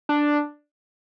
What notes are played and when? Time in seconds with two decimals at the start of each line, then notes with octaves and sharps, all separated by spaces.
0.09 D4